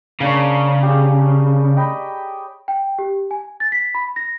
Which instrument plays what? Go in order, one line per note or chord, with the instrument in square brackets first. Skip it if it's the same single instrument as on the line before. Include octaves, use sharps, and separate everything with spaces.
[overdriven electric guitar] C#3 [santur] A#3 D4 C#5
[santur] G4 G#4
D#5 G5 B5
[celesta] G5
G4
G#5
A6
B6
B5
A#6